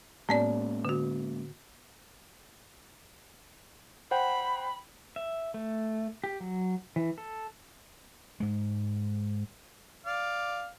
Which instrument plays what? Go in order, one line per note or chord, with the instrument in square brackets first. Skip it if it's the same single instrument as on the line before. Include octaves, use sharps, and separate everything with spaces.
[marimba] A2 B3 D5 [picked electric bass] G#3 A#3 C#4
[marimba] D3 F#4
[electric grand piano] C5 F#5 G5 [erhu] B5
[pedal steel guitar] E5
A3
G4
F#3
E3
A4
[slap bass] G#2 G#3
[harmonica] D5 F5